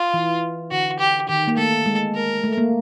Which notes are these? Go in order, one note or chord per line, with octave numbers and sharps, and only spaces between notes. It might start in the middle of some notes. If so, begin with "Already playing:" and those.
Already playing: F4
E3
D3 F#4
G4
D#3 G4
A#3
A3 A4
G#3
A#4
A3
A#3